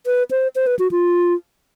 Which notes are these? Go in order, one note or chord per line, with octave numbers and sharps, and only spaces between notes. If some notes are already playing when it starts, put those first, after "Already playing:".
B4
C5
C5
B4
F#4
F4